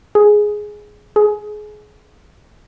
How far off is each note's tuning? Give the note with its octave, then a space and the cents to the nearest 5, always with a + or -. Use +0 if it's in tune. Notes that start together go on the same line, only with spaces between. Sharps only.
G#4 +5
G#4 +25